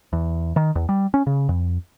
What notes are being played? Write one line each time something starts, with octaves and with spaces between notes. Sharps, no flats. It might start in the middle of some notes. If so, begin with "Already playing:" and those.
E2
D#3
E2
G3
C#4
C#3
F2